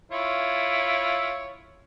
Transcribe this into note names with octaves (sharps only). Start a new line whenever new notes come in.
E4 F4 C#5